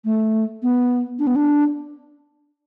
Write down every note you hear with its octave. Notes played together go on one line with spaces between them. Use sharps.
A3
B3
D4
B3
D4